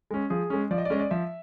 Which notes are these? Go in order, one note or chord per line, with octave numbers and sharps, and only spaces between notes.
G#3 C#4
F3 G#4
G#3 C#4
F3 D5
D#5
D5
G#3 C#4 D#5
D5
F3 E5